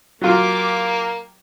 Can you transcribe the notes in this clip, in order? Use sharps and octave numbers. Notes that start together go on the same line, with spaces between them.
F#3 A#3 F4 G4 D6